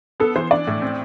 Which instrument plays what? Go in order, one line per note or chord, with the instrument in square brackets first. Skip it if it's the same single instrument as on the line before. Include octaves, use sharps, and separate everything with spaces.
[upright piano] B3 [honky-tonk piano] A4
[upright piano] E3 [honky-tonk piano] C5
[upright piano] D4 [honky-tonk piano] D5
[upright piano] A2
C4